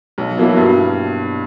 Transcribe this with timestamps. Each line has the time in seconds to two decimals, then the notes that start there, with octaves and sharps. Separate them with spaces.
0.18 B1
0.37 B2 F#3 A#3 E4
0.56 G2